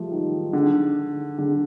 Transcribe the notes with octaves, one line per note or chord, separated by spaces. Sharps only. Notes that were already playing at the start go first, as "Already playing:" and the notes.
Already playing: F3 G3 A3
D#3
D3
D3